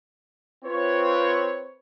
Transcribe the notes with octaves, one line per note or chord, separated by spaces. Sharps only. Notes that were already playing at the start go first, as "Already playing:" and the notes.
C4 F4 B4 C#5